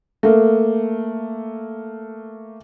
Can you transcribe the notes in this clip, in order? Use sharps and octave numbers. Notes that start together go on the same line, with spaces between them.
A3 A#3